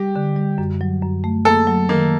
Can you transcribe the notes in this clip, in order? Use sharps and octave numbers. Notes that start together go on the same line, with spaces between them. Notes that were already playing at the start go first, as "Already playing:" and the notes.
Already playing: G3 G4
D3
G3
F#2
F#3
F#2
A3
A#3 A4
F#3
D#3 A#3